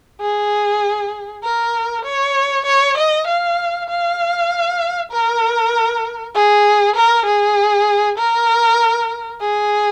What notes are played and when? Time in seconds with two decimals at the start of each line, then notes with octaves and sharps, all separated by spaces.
0.20 G#4
1.43 A#4
2.05 C#5
2.66 C#5
2.97 D#5
3.27 F5
3.89 F5
5.12 A#4
6.34 G#4
6.96 A#4
7.26 G#4
8.18 A#4
9.41 G#4